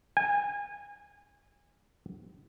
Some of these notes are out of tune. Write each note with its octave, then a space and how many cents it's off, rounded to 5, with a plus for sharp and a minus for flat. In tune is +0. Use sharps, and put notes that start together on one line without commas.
G#5 -25